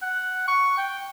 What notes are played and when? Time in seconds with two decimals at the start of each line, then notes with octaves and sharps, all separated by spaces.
0.02 F#5
0.48 C#6
0.77 G5